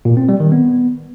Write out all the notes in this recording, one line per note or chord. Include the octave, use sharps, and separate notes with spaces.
A#2
C4
G3
D#3
B3